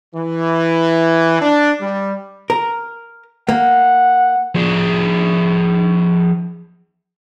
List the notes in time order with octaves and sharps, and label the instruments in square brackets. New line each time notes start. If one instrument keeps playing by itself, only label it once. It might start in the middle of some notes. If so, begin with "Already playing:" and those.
[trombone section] E3
D4
G3
[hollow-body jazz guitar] A#4
[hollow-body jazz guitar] A#3 [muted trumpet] F#5
[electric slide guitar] F3 G#4